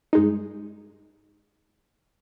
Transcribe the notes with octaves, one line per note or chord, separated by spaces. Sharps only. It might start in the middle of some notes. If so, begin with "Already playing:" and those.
G2 G#3 D#4